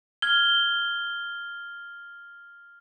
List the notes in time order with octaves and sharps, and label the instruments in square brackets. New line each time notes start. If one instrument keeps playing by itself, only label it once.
[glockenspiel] F6 G#6 G7